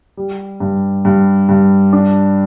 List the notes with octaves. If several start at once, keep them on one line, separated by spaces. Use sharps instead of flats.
G3
G2
G2
G2
D4